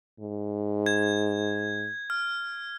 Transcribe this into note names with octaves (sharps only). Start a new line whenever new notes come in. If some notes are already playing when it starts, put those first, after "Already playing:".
G#2
G#6
F6